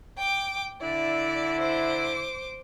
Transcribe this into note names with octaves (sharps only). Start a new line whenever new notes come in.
G5 D6
D3 E4 D5
C5 D6